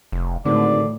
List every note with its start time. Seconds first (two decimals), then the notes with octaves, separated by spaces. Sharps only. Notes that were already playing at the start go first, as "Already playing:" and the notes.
0.12 F1
0.45 G#1 A2 D3 D5